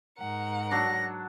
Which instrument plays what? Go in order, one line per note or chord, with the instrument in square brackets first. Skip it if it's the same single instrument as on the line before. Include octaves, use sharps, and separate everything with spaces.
[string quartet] G#2 A#4 F#5
[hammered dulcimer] F#3 D4 [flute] A#6